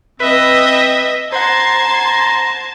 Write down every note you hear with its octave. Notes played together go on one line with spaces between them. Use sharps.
C4 B4 D#5 E5
C5 F#5 A5 A#5 C6 G#6